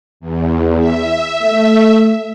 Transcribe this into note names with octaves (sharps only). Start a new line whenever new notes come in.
E2
E5
A3